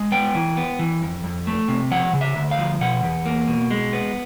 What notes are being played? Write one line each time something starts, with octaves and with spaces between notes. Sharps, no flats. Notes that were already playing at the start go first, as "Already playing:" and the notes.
Already playing: G#3
B3 G5
E3
B3
E3
F2
F2
A3
C3
F3 F#5
C#3
E5
D2
F5
F3
B2 F#5
E2
A#3
B2
G#3
B3